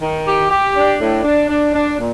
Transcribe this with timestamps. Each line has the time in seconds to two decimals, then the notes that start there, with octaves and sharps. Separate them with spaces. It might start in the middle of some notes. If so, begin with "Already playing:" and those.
0.01 D#3
0.26 G4
0.50 G4
0.75 D4
0.99 A2
1.23 D4
1.48 D4
1.73 D4
1.98 A#2